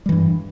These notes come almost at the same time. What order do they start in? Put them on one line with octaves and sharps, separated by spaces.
G3 E3 G2